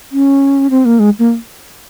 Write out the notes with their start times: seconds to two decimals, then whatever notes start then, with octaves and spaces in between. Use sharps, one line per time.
0.12 C#4
0.70 C4
0.85 A#3
0.99 G#3
1.19 A#3